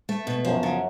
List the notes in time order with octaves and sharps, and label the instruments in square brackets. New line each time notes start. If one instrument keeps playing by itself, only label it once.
[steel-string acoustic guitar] A3
B2
[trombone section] F#2 [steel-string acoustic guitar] F3
[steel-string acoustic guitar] C#3